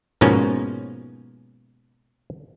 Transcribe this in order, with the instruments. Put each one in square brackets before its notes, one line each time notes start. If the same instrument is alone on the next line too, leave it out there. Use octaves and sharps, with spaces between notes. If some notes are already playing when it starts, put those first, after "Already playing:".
[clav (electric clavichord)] G#2 B2 F3 A#3 C#4